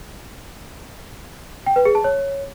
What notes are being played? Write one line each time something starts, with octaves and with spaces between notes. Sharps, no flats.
G5
B4
G#4
A5
C#5